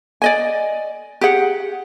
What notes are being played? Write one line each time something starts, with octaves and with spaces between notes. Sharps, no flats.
D5 D#5 G#5
G4 G#4 F#5